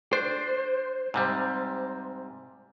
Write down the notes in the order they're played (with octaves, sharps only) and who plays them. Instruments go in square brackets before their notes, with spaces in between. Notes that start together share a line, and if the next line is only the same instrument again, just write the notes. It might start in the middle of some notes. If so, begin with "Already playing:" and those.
[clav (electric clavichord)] D4 [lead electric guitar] C5
[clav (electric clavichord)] G#2 C3 G3